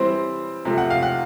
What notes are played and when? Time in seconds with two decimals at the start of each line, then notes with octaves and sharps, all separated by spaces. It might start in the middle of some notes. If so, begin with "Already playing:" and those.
Already playing: E3 G3 C4 C5
0.65 C3 F3 A3
0.78 F#5
0.90 F5
1.03 F#5